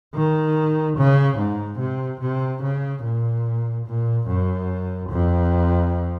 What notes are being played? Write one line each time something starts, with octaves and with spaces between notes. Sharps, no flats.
D#3
C#3
G#2
C3
C3
C#3
A#2
A#2
F#2
F2